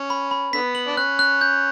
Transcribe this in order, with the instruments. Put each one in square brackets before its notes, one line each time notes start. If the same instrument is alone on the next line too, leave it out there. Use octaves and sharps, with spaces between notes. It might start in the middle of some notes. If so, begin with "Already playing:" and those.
Already playing: [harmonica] C#4
[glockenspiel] B5
B5
[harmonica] D3 B3 [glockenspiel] B6
[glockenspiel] F#7
[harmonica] D4
[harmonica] C#4 [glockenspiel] F#6
[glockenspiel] F#6
G6